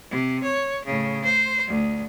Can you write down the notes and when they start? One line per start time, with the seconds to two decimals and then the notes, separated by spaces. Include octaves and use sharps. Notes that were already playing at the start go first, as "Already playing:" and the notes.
0.10 C3
0.43 C#5
0.85 A2 C#3
1.24 C5
1.67 D2